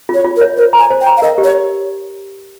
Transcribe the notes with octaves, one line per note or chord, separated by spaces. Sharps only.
F4
C#5
F4
A#4
C#5
A#4 C5
A#5
G#5
C5
G5
A#5
F5
A#4 D#5
G4
C#5